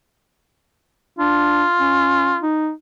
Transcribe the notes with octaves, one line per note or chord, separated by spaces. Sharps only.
D4 F4
C#4
D#4